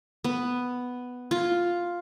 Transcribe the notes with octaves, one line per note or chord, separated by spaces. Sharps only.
B3
F4